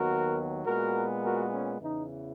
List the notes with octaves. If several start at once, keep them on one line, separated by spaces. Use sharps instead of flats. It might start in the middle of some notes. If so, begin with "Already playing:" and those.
Already playing: D#2 D#3 F#3 B3 F#4 A#4
A#2 G#3 B3 F#4 A#4
F#4 A#4
C#4
E2 C#3 E3 D#4